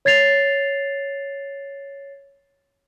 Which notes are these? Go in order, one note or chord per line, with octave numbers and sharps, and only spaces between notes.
C#5 G#6 A6 C7 F7